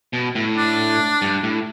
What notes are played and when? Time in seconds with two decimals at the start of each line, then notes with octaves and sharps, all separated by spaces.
0.13 B2
0.35 A2
0.57 D4
1.22 G2
1.43 A2